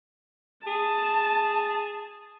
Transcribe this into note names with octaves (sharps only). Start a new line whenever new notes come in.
G#4 A5